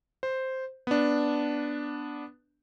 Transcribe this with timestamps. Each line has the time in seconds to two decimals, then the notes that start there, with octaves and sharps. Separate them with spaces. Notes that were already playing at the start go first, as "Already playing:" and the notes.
0.23 C5
0.87 B3 D4